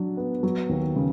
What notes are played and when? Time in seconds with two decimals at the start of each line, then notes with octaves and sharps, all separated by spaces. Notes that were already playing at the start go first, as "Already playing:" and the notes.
Already playing: F#3 D4
0.17 B3
0.43 F#3
0.69 D#2
0.96 C#3